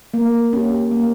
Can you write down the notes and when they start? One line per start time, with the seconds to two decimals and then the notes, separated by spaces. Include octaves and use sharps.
0.14 A#3
0.53 C#4 G4
0.91 A#3